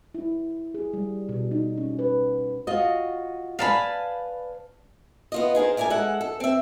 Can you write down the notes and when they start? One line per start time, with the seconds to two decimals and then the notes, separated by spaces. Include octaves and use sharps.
0.15 E4
0.74 G#4
0.93 G3
1.29 B2
1.51 D#4
1.78 C#4
1.99 B4
2.67 F4 F#4 D#5
3.59 B4 D5 F5 G#5 A5 B5
5.32 B3 F4 D#5
5.55 D#4 G#4 A#4 C5
5.77 A3 A#4 D5 F5 G#5
5.90 G#3 A4 F#5
6.21 A4
6.40 C4 E5